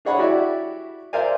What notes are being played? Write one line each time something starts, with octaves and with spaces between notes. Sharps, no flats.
D4 G#4 C#5 F#5 B5
E4 F#4 G4 D5 E5
A#4 C5 D5 E5 F5 G#5